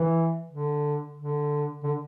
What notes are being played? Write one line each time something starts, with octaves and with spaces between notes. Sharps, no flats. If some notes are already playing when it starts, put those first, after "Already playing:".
Already playing: E3
D3
D3
D3